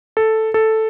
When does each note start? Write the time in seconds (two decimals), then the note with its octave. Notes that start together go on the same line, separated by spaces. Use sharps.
0.17 A4
0.54 A4